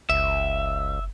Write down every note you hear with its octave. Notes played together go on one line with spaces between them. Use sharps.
F#1 C#2 E5